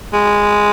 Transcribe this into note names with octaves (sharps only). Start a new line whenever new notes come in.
G#3